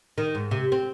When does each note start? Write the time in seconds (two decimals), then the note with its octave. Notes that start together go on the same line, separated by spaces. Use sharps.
0.18 D#3
0.35 G#2
0.51 C3
0.72 C4